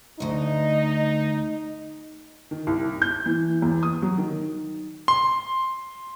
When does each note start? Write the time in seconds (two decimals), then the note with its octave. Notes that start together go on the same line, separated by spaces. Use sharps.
0.20 D2 D#4 D#5
2.51 D#3
2.67 C2
3.02 G6
3.26 E3
3.62 E2
3.83 D#6
4.02 F#3
4.18 D#3
5.08 C6